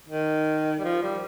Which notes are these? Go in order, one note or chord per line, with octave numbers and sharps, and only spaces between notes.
D#3
G3
F3
G3